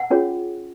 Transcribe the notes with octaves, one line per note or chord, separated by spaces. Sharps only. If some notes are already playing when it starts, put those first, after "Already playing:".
Already playing: F#5
C#4 F4 G#4 C#5